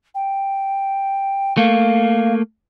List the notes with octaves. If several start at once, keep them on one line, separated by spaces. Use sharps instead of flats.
G5
A3 A#3 F5